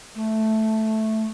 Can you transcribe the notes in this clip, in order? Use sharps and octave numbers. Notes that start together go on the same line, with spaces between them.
A3